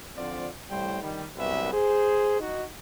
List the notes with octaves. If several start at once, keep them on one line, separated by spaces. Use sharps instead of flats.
D3 F3 C4 F4 D5
C2 A2 G3 C5 G5
D#3 G3
C2 F#2 B2 B4 E5
G#4 C5
D#4 F#4